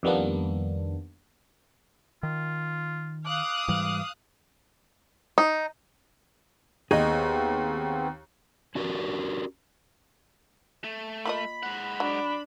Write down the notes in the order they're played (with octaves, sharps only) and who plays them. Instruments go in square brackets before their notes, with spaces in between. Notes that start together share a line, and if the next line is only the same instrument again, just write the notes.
[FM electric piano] F2 D#3 G3 A#3 B3 D4
[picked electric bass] D#3 [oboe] F4
[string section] F5 D#6 F#6 [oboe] D6
[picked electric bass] G#2 E3 G3
[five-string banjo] D#4
[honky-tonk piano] D#2 [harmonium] B3 C4 [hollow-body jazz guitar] G#4 D#5
[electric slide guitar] C#4 D4 F#4 G4 A#4
[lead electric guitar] A3
[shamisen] A#3 F4 D#5 [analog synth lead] B5
[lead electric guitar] G#3 F#5
[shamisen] F#3 [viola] D4